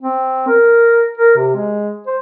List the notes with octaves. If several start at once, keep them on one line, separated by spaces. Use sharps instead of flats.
C4
A#4
A#4
C3
G#3
C5